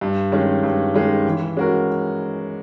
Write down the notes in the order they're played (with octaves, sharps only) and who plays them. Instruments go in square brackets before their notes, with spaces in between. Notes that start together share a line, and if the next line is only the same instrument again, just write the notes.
[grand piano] G2
D#3 G#3 C#4
G2
D#3 G#3 C#4
E3
G#3 C#4 F#4 A#4